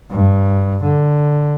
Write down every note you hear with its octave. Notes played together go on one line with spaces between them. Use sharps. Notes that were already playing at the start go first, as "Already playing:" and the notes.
G2
D3